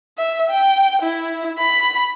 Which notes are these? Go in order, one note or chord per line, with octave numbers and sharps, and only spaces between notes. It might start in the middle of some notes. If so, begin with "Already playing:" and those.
E5
G5
E4
B5